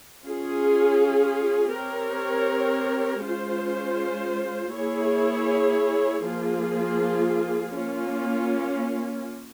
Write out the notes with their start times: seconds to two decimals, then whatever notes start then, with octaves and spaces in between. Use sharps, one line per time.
0.25 C#4 F4 G#4
1.75 C4 G4 A#4 C#5
3.25 G#3 C#4 F4 C5
4.76 A#3 E4 G#4 C#5
6.26 F3 A#3 F4 G#4
7.76 A#3 C#4 F4